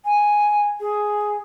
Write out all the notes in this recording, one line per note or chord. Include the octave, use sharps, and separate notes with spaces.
G#5
G#4